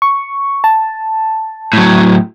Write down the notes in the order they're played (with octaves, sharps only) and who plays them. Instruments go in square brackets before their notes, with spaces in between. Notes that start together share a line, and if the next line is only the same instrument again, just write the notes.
[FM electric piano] C#6
A5
[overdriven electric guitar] A2 F#3